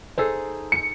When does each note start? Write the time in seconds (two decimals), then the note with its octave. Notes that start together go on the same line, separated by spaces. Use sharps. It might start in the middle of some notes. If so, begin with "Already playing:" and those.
0.18 D#4 G#4 A4 C5 E6 C7
0.72 C#7